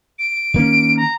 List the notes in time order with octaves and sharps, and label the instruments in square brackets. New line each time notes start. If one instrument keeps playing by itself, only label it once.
[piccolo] D7
[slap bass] D#3 A#3 C#4
[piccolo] A#5